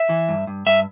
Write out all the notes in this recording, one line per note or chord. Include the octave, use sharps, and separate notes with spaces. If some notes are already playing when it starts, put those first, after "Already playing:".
Already playing: E5
E3
G2
G2
G2 E5